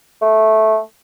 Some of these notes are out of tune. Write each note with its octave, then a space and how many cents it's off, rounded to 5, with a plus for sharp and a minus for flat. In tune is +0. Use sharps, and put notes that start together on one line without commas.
A3 -10